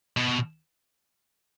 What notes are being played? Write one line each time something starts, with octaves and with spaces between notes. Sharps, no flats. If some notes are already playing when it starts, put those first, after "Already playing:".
B2